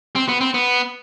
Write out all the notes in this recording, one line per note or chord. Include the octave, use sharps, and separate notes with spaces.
C4
B3
C4
B3